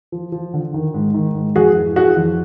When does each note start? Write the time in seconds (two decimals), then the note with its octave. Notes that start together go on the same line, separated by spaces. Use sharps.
0.12 F3
0.32 F3
0.54 D3
0.74 D#3
0.94 G#2
1.14 D#3
1.35 G#2
1.56 F2 F#4 G#4
1.77 E3
1.96 E3 F#4 G#4
2.17 F2